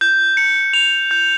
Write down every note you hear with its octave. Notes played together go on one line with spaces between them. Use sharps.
G6
C#7
F7
G6